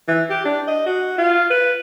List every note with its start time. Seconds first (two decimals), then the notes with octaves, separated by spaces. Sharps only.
0.08 E3
0.29 G4
0.45 D4
0.67 D#5
0.86 F#4
1.18 F4
1.50 B4